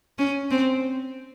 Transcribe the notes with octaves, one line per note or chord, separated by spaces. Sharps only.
C#4
C4